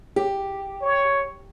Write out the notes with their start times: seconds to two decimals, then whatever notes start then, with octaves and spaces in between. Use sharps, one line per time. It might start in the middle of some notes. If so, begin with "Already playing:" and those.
0.16 G4
0.82 C#5